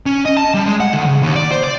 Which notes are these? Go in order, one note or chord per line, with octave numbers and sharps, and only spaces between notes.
C#4
D#5
A5
G3
G#3
F#5
D2
C#3
D#2
D5
C5
D5